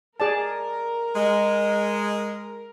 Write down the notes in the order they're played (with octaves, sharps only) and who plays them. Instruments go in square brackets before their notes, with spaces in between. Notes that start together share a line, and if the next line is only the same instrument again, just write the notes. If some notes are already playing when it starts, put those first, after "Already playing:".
[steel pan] G#4 D5 A5 [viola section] A#4
[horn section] G#3